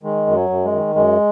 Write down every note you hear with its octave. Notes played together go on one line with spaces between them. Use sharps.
D#3 G#3
F#2
F#3
F#2
G#3
D#3
F#2 G#3